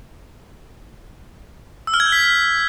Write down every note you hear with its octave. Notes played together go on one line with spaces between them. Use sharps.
E6
F6
G#6
G6
B6